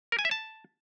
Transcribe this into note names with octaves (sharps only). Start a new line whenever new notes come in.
A#4
G#5
E5
A5